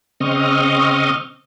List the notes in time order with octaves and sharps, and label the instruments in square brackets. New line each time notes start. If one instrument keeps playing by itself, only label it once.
[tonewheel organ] C#3 C4 D#5 C#6 D#6 F6